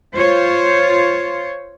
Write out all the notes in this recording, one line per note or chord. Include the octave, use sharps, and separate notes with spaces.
F4 C5 C#5